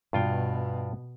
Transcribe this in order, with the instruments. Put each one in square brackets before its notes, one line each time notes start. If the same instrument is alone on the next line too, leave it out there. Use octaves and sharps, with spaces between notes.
[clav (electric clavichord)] G2 F4 G5 [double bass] B2